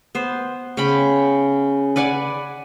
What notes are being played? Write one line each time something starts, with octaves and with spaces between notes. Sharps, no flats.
B3 C5
C#3 C#4 G5 B5
B4 D5 F#5 G#5